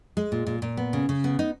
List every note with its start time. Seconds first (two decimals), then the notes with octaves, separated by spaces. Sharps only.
0.17 G#3
0.32 A#2
0.47 A#2
0.62 A#2
0.77 B3
0.93 C#3
1.09 C#3
1.24 B3
1.39 D#4